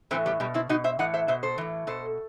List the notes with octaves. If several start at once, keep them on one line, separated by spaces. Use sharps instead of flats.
A2 E3 A3 C4
G3 B3
B2 G3
C4 E4
B2 D#4 F#4
C5 E5
A2 E3 D#5 F#5
C5 E5
B2 C5 E5
A4 C5
A2 E3
B2 A4 C5